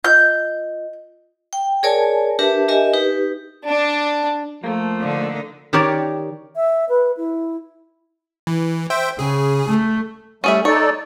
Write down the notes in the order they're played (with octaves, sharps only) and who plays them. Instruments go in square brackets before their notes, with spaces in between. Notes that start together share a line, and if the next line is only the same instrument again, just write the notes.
[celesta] F4 D#5 [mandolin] G6
[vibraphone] G5
G#4 A#4 C#5 D5 G#5 A5
D4 G4 A#4 B4 E5 A5
G4 A#4 D#5 E5 G#5
D#4 G4 B4
[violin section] D4
[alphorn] F3 [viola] A3 [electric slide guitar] A#3
[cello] D3 D#4
[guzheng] D#3 D#4 G4 A#4 C#5 D5
[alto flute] E5
B4
E4
[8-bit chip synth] E3
C5 E5 G5
[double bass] C#3 [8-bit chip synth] G#4
[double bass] A3
[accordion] G3 A3 [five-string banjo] C#4 G#4 E5
[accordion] D#4 A4 D5 [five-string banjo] C#5